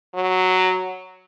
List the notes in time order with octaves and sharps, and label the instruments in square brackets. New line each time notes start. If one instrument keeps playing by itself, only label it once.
[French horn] F#3